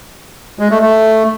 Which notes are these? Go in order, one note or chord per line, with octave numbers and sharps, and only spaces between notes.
G#3
A3
A3